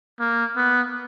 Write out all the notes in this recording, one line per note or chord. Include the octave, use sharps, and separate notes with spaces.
A#3
B3